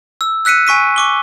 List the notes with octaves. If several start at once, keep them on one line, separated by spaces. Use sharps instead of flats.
E6
E6 F#6 B6 C#7 D#7
G#5 C#6 B6 D#7
C#6 D6 G7